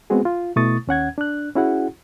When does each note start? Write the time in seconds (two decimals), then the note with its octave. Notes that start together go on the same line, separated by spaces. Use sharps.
0.10 G#3 B3 C4 F#4 G#4
0.25 F4
0.56 B2 A3 E4 C#6 D#6 A6
0.87 D#2 C#4 F#5 G#6
1.18 D4 F#6
1.56 C#4 E4 F#4 G#4 F#5